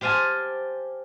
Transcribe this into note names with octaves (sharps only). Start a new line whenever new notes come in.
G4 C5 F5 G#5 A5